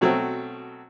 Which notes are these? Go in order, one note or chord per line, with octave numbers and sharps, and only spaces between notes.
B2 F#3 A3 C4